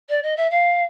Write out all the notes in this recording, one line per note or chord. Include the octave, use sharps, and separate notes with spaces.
D5
D#5
E5
F5